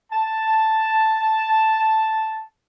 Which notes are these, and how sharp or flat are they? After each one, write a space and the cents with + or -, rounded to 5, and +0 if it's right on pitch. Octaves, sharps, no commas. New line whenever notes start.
A5 +0